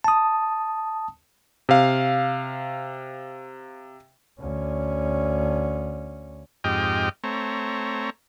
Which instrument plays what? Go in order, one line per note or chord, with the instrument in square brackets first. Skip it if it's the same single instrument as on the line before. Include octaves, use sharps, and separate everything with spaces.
[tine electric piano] A5 D#6
[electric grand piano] C3 F5
[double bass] D2 C#4
[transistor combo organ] F2 G#2 G4 D#5 G5 F6
A3 C4 C#5 A#5